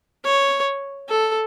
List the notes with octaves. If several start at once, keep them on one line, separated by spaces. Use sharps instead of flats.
C#5
A4